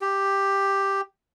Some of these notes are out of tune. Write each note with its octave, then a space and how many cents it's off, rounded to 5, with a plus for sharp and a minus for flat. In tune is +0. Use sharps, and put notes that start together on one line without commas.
G4 +5